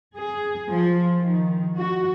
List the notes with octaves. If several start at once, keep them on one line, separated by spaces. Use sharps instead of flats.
G#4
F3
D#3
F#4